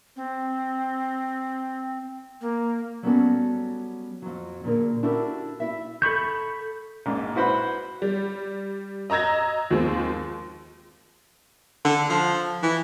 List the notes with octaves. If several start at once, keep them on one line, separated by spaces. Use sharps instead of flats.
C4
A#3
F#3 G3 B3 C#4 F#4 A4
F2 F#3
A#2 D3 G#4 A#4
D4 E4 F#4 G4 A4 A#4
E4 E5
A4 B5 C#6 G6
A#1 G#2
E4 F#4 B4 C5 F#5 B5
G3
D#5 A#5 E6 G#6 A#6
D#2 F3 G#3 C4
D3
F3
E3